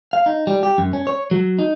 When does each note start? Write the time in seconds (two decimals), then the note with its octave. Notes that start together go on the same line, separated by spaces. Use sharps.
0.13 F5
0.26 D#4
0.47 G3
0.63 G4
0.78 F#2
0.93 C#4
1.07 C#5
1.31 F#3
1.59 D#4